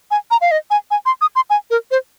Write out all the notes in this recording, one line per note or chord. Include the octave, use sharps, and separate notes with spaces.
G#5
A#5
F5
D#5
G#5
G#5
C6
D#6
C6
G#5
A#4
C5